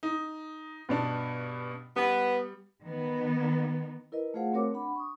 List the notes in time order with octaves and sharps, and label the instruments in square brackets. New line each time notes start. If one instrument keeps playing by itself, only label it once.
[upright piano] D#4
G2 B2 D4
[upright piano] G3 [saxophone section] B3
[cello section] D#3 B3
[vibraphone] E4 A#4 B4 D#5
A3 F4 G#4 C5 F5 F#5
A3 C4 F#4 A#4 C#5 D6
D4 F#5 B5
C#6 D#6